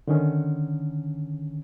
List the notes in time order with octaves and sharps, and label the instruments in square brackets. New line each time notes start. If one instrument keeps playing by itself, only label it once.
[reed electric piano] D3 D#3 C#4